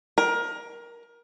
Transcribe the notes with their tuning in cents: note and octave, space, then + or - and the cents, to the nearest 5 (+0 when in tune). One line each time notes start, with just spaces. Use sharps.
A#4 +20